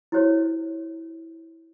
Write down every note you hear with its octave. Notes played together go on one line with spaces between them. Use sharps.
E4 F#4 G4 C5 C#5